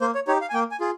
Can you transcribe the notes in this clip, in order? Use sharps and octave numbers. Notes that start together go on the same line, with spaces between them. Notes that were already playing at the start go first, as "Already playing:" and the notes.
A#3 C5
C#5
D#4 G4 C#5
F5
G#5
A#3 G5
G#5
F4 G#4